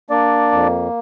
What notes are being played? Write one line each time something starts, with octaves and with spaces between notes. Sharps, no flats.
A#3 D4 D5
F2